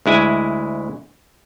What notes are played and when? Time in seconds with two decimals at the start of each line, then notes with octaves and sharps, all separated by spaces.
0.06 D2 G#3 E4 G#5